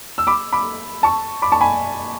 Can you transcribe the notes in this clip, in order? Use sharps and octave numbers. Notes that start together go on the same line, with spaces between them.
E6
B5 D6
B5 D6
A5 C#6
B5 D6
A5 C#6
G#5 B5